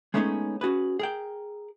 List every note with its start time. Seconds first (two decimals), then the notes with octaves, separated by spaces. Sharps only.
0.14 G#3 A3 B3 C#4 D#4 G#4
0.61 C#4 F#4 G#4 B4
0.99 G#4 A#4 G5